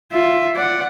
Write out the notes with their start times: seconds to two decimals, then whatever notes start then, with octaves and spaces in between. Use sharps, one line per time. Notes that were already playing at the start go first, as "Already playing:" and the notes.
0.12 F4 E5
0.56 D5 F#5